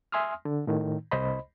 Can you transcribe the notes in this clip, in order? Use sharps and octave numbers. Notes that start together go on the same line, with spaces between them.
E5 G#5 C6 D#6 F6
D3
A2 D#3
C2 C5 D#5 B5